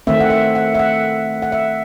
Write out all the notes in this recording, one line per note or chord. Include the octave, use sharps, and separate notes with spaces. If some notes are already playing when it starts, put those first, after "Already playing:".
D#3 A3 C4 E5
F#5
E5
F#5
E5
F#5
F#5
E5